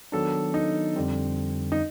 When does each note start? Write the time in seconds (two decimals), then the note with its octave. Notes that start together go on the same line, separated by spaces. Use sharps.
0.12 D#3 F#3 B3 D4 A4
0.54 D#4
0.96 F2 D3 G3 C4
1.72 D#4